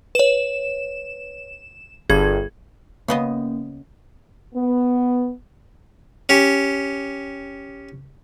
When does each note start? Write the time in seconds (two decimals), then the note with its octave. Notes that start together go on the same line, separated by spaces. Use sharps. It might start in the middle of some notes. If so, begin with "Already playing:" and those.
0.15 B4 C#5 E7
2.10 G1 G#4 G#6
3.08 C#3 A#3 B3 C#4 D#5
4.55 B3
6.29 C#4 G4